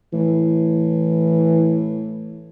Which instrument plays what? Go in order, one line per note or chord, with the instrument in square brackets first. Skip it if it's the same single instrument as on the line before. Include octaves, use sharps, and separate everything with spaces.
[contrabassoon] A2 [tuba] E3